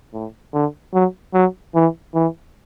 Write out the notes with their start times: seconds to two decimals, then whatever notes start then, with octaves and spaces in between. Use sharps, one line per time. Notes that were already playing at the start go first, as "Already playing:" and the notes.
0.14 A2
0.53 D3
0.93 F#3
1.34 F#3
1.75 E3
2.14 E3